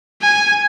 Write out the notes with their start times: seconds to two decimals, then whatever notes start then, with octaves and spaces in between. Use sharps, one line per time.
0.22 G#5